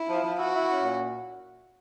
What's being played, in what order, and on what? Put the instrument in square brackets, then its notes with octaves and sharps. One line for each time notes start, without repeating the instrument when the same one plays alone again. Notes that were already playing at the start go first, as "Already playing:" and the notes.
Already playing: [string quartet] E4
[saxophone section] F3
F3
[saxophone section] E4 [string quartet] F#4
[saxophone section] E4
C#4
A#2